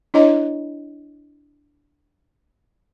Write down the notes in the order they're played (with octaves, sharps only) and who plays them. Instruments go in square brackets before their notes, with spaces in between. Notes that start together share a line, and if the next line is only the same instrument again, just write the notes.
[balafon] D4 E4 C#5 D#5 A#5